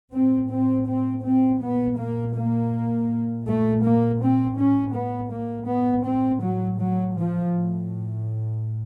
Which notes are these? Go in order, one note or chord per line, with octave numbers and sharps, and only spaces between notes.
A2 C4
C4
C4
C4
A#2 B3
A#3
A#3
A#2
A3
A#3
C4
A2 C#4
B3
A#3
B3
A2 C4
F#3
F#3
F3
A2